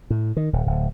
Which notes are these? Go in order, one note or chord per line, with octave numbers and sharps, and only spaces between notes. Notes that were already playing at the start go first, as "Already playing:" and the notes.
A2
D#3
D#1
D1